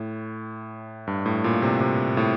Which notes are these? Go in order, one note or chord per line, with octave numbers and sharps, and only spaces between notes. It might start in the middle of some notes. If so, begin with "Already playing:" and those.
Already playing: A2
G2
A2
A#2
C3
C3
A2